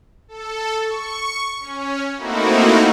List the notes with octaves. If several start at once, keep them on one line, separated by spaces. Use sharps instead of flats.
A4
C#6
C#4
A3 A#3 C4 D#4 E4 F#4